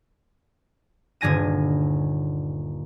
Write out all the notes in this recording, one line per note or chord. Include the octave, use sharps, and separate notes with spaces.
D#1 G2 D3 G#5 A#6 D#7